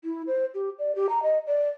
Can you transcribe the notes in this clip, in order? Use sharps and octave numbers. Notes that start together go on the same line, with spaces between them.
E4
C5
G4
D5
G4
A#5
D#5
D5